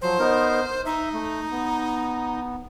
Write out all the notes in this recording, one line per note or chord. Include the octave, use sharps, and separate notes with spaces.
F3 F#3 C5
B3 D#4 A#4
D#4 E5
A3
B3